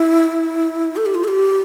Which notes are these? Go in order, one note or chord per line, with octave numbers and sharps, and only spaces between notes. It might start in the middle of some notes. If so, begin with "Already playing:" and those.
Already playing: E4
A4
G4
F4
A4
G4